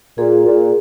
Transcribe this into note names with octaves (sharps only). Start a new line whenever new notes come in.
A#2 G#4
A#2